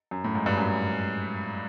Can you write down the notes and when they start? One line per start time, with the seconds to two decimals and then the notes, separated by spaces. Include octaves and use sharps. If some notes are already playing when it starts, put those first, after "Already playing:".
0.11 F#2
0.24 A2
0.35 G#2
0.46 G2
0.57 F#2